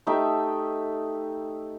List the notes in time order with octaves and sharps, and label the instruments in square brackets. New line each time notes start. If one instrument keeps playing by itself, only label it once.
[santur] A3 D#4 G4 E5